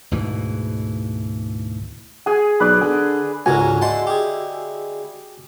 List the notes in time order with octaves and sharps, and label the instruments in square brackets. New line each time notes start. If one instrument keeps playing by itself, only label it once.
[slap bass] D2 G#2 B2 E3
[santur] G#4 G#5
[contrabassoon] B1 [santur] B4 D5
[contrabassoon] D3 [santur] G#4
[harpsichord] C#2 G#2 D3 [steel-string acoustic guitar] C#4 A#4 [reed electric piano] F#4 G#5
[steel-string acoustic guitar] D3 G#3 E4 [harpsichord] F#5 A5 C6
[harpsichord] G4 G#4